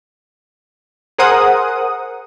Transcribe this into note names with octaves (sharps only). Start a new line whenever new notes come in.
G#4 A#4 C5 F#5 D#6